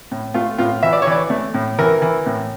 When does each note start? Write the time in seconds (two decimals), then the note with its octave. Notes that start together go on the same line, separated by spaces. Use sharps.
0.11 A2
0.34 A3 F4
0.58 A2 F4
0.83 E3 E5
0.93 D5
1.02 C#5
1.07 E3 D5
1.30 A3
1.54 A2
1.79 E3 A#4
2.02 E3
2.26 A2